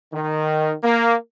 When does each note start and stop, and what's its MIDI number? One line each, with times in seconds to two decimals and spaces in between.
0.13 0.73 51
0.83 1.14 58